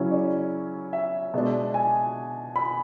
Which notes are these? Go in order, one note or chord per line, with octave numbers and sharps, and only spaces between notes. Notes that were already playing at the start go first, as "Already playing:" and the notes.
Already playing: C#3 F#3 C#4 E4 C#5
D5
E5
B2 G#3 D4
G#5
B5